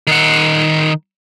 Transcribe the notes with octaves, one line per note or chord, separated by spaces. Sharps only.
D#3 F#5